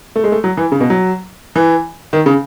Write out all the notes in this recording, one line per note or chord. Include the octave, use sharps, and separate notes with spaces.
A3
G#3
A3
F#3
E3
C#3
B2
F#3
E3
D#3
C#3